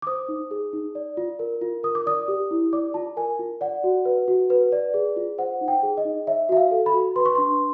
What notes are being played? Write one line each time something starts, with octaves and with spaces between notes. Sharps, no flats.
D6
C5 D#6
D#4
G#4
D#4
D5
F4
A#4
F4
A#4 D#6
D6
D5 D#6
G4
E4
D5 D6
F4 A5
A#4 G#5
F4
D5 F#5
F#4
B4
F#4
B4
D5
G#4
F4
C5 F#5
D#4
G5
G#4
D#5
D#4
C#5 E5
F#4 E5
F5
A4
B5
F#4
B4 C6
C#6
D4 C6